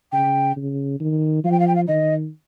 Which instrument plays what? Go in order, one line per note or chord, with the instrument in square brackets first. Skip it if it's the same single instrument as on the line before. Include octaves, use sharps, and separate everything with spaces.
[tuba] C#3 [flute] G5
[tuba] C#3
D#3
[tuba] F3 [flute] F5
[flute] G5
F5
G5
F5
[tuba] D#3 [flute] D#5